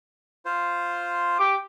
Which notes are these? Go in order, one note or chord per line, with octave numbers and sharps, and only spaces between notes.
F4 C5
G4 D6